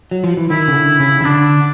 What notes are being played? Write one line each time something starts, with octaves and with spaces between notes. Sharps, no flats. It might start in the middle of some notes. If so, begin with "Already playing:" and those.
F#3
F3
E3
D#3 E4
C#3
D3
C#3
D#3
D3 D4